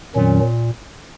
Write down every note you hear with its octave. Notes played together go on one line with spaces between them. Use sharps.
F2 A#2 D#3 F#3 C#4